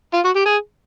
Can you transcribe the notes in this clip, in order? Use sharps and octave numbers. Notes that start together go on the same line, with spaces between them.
F4
F#4
G4
G#4